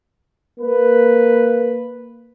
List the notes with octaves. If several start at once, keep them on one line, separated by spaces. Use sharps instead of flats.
A#3 B4